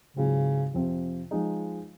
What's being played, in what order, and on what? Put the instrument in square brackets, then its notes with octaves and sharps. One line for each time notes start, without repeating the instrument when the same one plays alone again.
[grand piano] G#2 F#3 C4 F4 [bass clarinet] C#3
[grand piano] F2 C3 F3 C4
F3 G#3 D#4